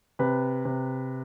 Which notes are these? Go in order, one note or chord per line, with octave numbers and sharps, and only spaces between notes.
C3 B4
C3